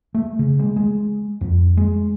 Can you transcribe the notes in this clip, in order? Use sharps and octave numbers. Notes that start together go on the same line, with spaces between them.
A3
C#3
G#3
G#3
F2
G#3